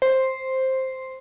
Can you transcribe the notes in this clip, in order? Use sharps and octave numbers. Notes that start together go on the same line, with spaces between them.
C5